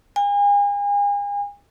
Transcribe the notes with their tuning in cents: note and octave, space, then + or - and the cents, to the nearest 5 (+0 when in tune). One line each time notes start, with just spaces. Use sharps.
G#5 -40